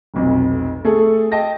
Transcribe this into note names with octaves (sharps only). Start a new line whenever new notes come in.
F1 B1 F2
A3 G#4 A4
D#5 G5 A5 A#6